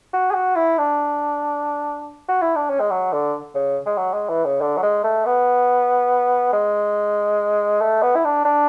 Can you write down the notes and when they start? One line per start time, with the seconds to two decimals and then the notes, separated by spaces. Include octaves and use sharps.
0.13 F#4
0.31 G#4
0.34 F#4
0.56 E4
0.78 D4
2.28 F#4
2.42 E4
2.55 D4
2.69 C#4
2.80 G#3
2.91 F#3
3.12 D3
3.55 C#3
3.86 G#3
3.97 F#3
4.13 G#3
4.29 E3
4.45 C#3
4.61 D3
4.77 F#3
4.83 G#3
5.04 A3
5.26 B3
6.53 G#3
7.81 A3
8.02 B3
8.16 E4
8.24 D4
8.45 D4